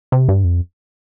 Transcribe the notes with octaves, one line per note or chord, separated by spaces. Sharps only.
C3
G2
F2